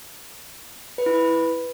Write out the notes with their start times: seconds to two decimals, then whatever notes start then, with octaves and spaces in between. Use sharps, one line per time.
0.98 B4
1.06 E4
1.14 B4